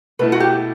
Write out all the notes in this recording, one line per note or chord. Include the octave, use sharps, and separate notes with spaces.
B2 A3 E4 B4
F#4
G4